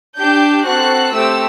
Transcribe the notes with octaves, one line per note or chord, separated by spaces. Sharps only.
D4 G4 G6
C4 F#4 A4 F#6
A3 C4 G4 E6